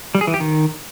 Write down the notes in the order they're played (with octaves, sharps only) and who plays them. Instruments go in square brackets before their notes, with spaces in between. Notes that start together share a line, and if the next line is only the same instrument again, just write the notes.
[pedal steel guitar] G3
G#4
E3
G4
D#3